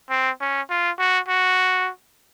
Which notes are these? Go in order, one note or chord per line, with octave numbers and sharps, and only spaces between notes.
C4
C#4
F4
F#4
F#4